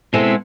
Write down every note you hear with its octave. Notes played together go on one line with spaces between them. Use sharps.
B2 G#3 C4 E4 A4